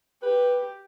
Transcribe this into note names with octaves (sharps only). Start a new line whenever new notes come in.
G4 B4